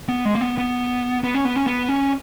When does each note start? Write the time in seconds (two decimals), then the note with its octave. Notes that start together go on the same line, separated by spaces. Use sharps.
0.09 B3
0.25 G#3
0.35 A#3
0.41 B3
0.58 B3
1.24 B3
1.34 C#4
1.45 B3
1.56 C#4
1.67 B3
1.89 C#4